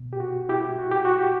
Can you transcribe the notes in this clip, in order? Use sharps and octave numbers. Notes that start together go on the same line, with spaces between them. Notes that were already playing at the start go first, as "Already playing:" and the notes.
Already playing: B2
G4
F#4
E4 G4
F#4
G4
F#4
G4